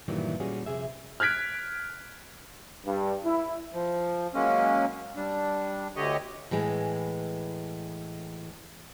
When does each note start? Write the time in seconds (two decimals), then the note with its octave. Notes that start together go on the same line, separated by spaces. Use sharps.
0.08 G2 A#2 D#3 E3 F#3 G3
0.40 A#2 G3 C#4 F#4 G#4
0.66 F2 C3 G#4 E5
1.20 F6 F#6 G#6 B6 D7
2.85 G2
3.25 E4
3.74 F3
4.34 F#3 G#3 A#3 C#4
5.16 G3 D4
5.96 D2 D3 G4 C#5 D#5
6.51 A2 E3 G#3